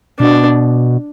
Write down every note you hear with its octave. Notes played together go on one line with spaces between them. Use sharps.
B2 D4